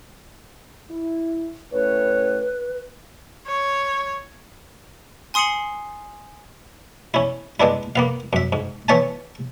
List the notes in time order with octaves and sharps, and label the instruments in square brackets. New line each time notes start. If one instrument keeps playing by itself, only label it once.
[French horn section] E4
[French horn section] A2 C#4 C#5 [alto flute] B4
[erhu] C#5
[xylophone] G#5 C6 D#6 C7 C#7 F#7
[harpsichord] C#4 E4
G#3 B3 D4 E4
A#3 B3 F5
F#2 E5
G#2
E3 C#5 E5 G#5 A5